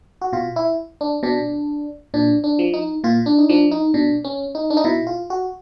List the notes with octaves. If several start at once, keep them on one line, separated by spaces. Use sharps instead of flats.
F#4
B2 F4
E4
D4
B2 D4
A#2 D4
D4
F3
D#4
A#2 F4
D4
D#4
F3 D4
D#4
B2 D4
C#4
D#4
D4
D#4
B2 E4
F4
F#4